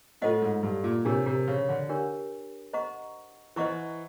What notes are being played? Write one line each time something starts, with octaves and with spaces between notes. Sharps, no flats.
A2 F4 A4 C5 D#5 F#5
G#2
G2
A#2
C3 D4 G4 A#4 C#5
C3
C#3
D3
D4 G4 A#4 C#5
C5 D#5 F#5 A#5 C#6
E3 C5 D#5 F#5 A#5 C#6